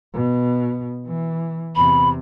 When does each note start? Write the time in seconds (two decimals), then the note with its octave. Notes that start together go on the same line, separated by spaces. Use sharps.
0.14 B2
1.06 E3
1.76 E2 C3 B5